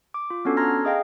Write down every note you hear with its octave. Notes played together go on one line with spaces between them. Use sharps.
D6
F4
B3 C#4 D4 F#4 A4
A5 A#5 C6 F6 G#6 A#6
G#4 D#5 F5 G5